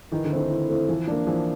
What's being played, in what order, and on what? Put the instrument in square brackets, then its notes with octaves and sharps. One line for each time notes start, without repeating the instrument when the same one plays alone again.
[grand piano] D#3 [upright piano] E3
[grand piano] D3
[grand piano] D#3 [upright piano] A3 C4 E4
[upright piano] E3
A3 C4 E4
[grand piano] E3 [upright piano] F3
[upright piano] A#3 D4
[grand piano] E3 [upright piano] F3